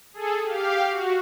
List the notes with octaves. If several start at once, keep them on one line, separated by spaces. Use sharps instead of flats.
G#4 A4
G4 F5
F#4